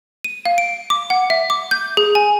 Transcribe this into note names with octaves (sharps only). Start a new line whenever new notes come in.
D#7
F5
D7
D6
F#5
E5
D6
G6
G#4
G#5